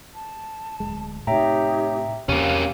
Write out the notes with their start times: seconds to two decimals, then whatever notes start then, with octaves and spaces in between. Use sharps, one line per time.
0.13 A5
0.80 D1 B1 G#3
1.27 A2 C3 D#4 G4 C#5 E5 G5 A#5
2.29 E2 C3 A#3 C#4 G4 F5 F#6